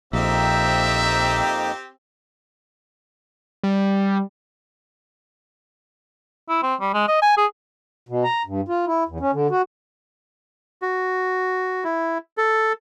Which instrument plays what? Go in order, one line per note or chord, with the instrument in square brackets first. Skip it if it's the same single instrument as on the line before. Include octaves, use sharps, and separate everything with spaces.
[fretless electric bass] A#1 [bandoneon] F2 A#3 D#4 [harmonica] C4 G4 [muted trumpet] E5
[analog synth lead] G3
[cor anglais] E4
C4
G3
G#3
D#5
G#5
G#4
[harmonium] B2
A#5
G2
F4
E4
E2
C#4
D3
F#4
[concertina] F#4
E4
A4